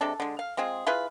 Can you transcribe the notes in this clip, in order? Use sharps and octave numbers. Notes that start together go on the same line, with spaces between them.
C3 G#3 D4 A4
D3 G#3
F5
G#3 C4 F4 G#4
E4 F4 G#4 B4